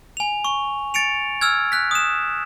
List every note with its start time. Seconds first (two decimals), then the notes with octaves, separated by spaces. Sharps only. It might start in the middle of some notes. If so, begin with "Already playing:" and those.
0.17 G#5 F7
0.44 C#6
0.94 A6 C#7 D7 F7
1.41 E6 F6 G#6
1.72 F#6 B6
1.91 D#6 E7